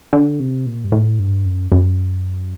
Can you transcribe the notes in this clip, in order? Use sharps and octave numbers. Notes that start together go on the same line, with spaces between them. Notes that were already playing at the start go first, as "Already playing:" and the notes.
D3
C3
A#2
G2
A2
G2
F#2
F#2